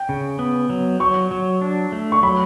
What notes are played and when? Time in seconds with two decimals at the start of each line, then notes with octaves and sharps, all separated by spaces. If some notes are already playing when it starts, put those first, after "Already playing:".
Already playing: G5
0.09 C#3
0.39 B3
0.70 F#3
1.00 F#3 C#6
1.31 F#3
1.62 D4
1.92 A3
2.12 C#6
2.23 F#3 B5